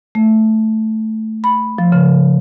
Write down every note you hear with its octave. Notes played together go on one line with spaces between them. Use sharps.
A3
B5
F3
C#3